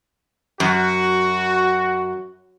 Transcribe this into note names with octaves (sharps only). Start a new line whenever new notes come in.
F#2 F#4